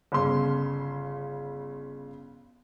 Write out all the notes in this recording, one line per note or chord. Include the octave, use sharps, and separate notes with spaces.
G1 C#3 C6